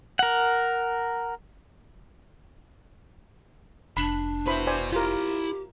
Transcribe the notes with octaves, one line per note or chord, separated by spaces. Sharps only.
A#4 F#5
F1 D4 B5
E4 F#4 B4 C5 B5
C5 D5 G#5
E4 F4 G4 A#4 C6